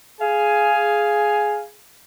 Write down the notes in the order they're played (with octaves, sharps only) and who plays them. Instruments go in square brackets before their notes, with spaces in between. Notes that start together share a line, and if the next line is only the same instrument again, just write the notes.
[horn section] G#4 F5 G#5